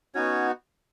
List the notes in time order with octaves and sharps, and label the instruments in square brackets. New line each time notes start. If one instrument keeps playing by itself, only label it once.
[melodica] B3 C#4 D#4 F#4 C#5